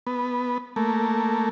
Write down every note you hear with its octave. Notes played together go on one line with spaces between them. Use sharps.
B3
A3 A#3